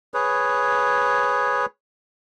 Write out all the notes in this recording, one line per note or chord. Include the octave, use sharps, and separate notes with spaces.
G#4 B4 C#5